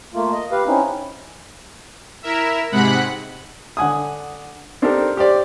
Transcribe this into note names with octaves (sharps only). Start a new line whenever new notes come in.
A3 A#3 F4
D#5
G4 B4 F5
C4 C#4 D#4 E4
E4 A#4 E5
G#2 C3 G#3 F#5 B5 F#6
D3 F#5 G#5 D#6
C4 D4 D#4 G4 A4 A#4
G4 C5 D5